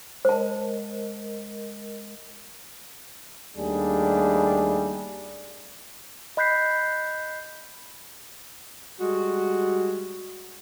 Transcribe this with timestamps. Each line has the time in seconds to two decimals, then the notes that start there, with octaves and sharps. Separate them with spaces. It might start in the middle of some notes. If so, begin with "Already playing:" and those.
0.25 G#3 A#4 C5 D#5 A5
3.57 D#2 G3 A3 D4 G#4
6.37 D#5 B5 F#6 G6 B6 C7
9.00 G3 G#3 F#4